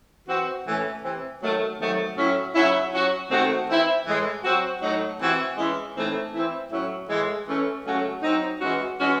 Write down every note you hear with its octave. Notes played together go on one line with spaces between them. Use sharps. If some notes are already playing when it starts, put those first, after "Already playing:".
E3 C4 F#4
A2 E3 A3 C#4
C3 E3 C4
D#3 F#3 A3
C3 D#3 F#3 A3
A2 F#3 C#4 E4
C#3 F#3 C#4 E4
F#3 C#4 F#4
C3 D#3 A3 C4 F#4
E3 C4 E4
A2 E3 G#3
F#3 C4 F#4
A2 F#3 A3 D#4 F#4
C3 E3 C4 F#4
E3 G#3 C#4 E4
A2 E3 A3 C4 D#4
E3 C4 E4
A2 F#3 C#4 E4
A2 E3 G#3
E3 A3 C#4
C#3 F#3 A3 C#4 F#4
F#3 C4 D#4
E3 G#3 C#4 F#4
E3 G#3 C#4 F#4